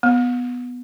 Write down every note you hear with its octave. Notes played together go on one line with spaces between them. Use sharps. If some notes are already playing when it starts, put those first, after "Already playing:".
B3